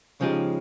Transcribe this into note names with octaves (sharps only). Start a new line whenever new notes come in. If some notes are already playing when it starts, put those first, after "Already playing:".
C#3 F3 G#3 D#4 G4